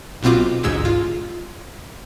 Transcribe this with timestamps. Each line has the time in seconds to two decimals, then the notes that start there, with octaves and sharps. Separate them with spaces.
0.23 B1 B2 C4 F4 D6
0.63 A1 D2 G#2 G#3 E6 G#6
0.85 F4